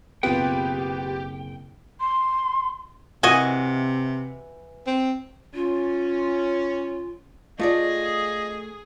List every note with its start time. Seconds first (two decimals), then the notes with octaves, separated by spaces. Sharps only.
0.23 F#1 B2 B3 C4 F4 G4 B4 G5
2.00 C6
3.23 C3 E3 F#4 D#5 G#5
4.87 C4
5.54 C#4 F4
7.59 A3 F4 G#4 A4 D5 D#5